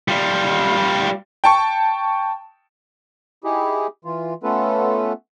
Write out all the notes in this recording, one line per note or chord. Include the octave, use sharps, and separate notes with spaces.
G3 F4
G5 A5 C#6
D#4 E4 G4 G#4
E3 F4
A3 B3 C#4 F4 A4 B4